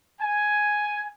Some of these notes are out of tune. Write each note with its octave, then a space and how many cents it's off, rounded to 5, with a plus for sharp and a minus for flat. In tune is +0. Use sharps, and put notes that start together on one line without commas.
G#5 +5